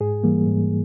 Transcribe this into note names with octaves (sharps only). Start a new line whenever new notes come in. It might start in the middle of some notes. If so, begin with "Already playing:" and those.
G#2 G#4
E3 G3 A#3
G#2